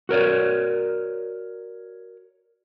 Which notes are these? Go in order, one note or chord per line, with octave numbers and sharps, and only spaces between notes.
F#4 A#4 C#5 D5